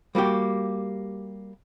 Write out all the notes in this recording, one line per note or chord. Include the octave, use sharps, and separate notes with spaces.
G3 A#3 F#4 G4